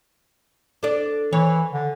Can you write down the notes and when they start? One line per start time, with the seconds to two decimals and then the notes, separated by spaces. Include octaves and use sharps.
0.83 D4 A4 D5
1.33 E3 C#5
1.73 D3